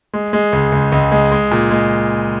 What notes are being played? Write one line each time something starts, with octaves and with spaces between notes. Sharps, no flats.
G#3
G#3
C#2
C#2
C#2
G#3
G#3
A#2
G#3